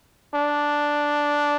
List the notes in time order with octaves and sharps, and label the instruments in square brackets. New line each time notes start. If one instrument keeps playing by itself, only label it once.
[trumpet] D4